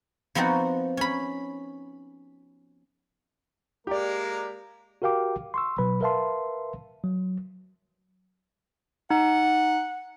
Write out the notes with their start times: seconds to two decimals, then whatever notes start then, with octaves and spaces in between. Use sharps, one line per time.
0.35 F3 B3 C4 D#4 F#4
0.97 C#4 B5
3.87 G#3 A#3 G4 A#4 D5
5.02 F#4 G4 A#4 F5 G5 D6
5.54 C6 C#6 E6
5.78 B2 F#3 B4 B5
6.01 A#4 B4 E5 F5 A5 C6
7.04 F#3
9.10 D#4 F#5